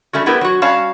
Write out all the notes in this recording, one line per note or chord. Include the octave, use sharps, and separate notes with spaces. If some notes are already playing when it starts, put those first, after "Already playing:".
G3 A3 C#4 F#4
A3 B3 E4 G4 A#4 B4
F#3 F#4
G3 C#4 F#4 C#5 F5 A5